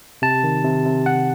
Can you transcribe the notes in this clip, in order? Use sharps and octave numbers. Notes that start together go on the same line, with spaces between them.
C3 A5
D#3
C3
C3
C3 F#5